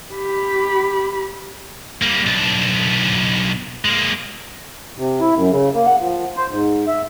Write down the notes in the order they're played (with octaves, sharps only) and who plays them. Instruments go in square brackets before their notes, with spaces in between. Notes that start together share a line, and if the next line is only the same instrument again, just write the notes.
[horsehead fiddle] G4 B5
[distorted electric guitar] G3 A#3
B1 D4
G#3 A#3
[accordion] C3
E4
F#2
C#3
A#3
F#5
F3
C5
G#2
E5